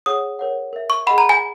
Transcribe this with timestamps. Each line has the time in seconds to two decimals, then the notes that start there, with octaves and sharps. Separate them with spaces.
0.06 G#4 C#5 F#5 D#6
0.39 A#4 C#5 F#5
0.73 A#4 E5
0.90 C#6
1.07 G#4 D#5 F#5 B5
1.18 A#5
1.29 G#5